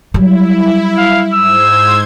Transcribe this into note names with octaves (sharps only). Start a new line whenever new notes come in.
F#3 G3 E4
F5
G#2 C5 E6 G#6